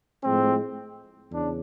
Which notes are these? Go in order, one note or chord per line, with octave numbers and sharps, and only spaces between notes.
A2 F3 G#3 C4
E2 C#3 D4